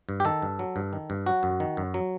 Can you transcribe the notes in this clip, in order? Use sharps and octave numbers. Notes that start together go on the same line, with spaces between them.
G2
G4
D#3 A4
G2
F#3
G2
D#3
G2
F#3 F#4
F#2
D#3
F#2
F#3